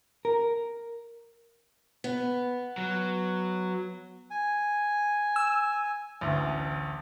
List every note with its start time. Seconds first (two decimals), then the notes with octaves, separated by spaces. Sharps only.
0.25 A#4
2.04 B3
2.78 F#3
4.31 G#5
5.36 E6
6.21 A1 D2